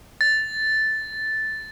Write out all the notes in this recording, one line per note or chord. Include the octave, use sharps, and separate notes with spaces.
A6